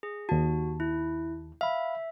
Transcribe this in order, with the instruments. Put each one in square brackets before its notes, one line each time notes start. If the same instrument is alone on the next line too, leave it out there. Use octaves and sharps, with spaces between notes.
[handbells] G#4
[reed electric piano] D#2 A5 [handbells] F#4
[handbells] E4
[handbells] E5 [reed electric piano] F5 B5